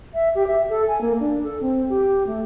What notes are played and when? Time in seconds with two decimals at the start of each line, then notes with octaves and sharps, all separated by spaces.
0.14 E5
0.35 G4
0.47 E5
0.69 A4
0.88 G#5
1.01 A#3
1.20 D4
1.43 A4
1.61 C4
1.90 G4
2.27 A3